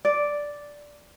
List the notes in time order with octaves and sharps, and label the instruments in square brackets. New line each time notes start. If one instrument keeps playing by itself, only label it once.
[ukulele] D5